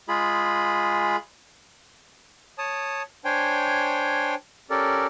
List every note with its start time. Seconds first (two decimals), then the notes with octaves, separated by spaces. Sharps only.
0.08 G#3 F4 G#4 B5
2.58 C#5 A5 D#6
3.25 D4 C5 C#5 G5 G#5
4.70 C#4 G4 A4 A#4 D5